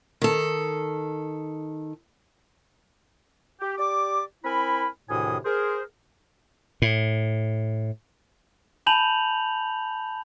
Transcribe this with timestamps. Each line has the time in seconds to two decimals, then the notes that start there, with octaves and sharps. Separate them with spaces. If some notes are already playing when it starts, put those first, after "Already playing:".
0.22 D#3 A4
3.61 G4
3.78 G4 D5 D6
4.45 C4 E4 A#4 G#5 B5
5.10 D2 A2 C3 D#3 G#5 D#6
5.45 G#4 A#4 C5
6.82 A2
8.87 G#5 A5 B5 G6 F7 F#7